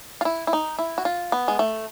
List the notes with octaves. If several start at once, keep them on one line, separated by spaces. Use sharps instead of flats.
F4
E4
E4
D#4
E4
F#4
F4
B3
G#3
A3